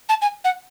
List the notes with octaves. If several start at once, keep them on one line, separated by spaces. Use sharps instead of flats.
A5
G#5
F#5